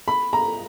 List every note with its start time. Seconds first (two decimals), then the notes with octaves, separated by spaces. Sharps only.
0.08 B5
0.33 A#5